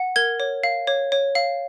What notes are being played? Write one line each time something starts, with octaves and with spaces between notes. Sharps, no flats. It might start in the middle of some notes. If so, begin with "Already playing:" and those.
Already playing: F#5
A#4 G#6
C#5
F5
C#5
C#5
F5